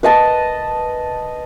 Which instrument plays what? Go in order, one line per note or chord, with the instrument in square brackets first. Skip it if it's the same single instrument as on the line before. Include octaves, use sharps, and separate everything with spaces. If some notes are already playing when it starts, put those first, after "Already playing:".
[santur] B4 D#5 A5